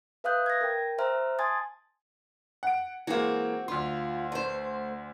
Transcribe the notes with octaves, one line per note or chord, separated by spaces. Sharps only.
B4 E5 F5 D#6 F#6 G6
G#6 A#6
A#4 G5
C5 E5 A#5 F6
G#5 A5 C6 D#6 G#6 A6
F#5 D7
E3 G#3 A#3 C4 F#4
D2 F4 C6
A3 C5